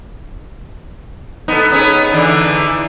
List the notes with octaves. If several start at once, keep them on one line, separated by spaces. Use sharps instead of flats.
B3 D#4 A4
B3 C#4 G#4
E2 D3 E3